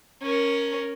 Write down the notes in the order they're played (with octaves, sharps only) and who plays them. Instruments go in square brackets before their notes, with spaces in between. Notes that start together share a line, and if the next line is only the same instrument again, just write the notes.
[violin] C#4 A#4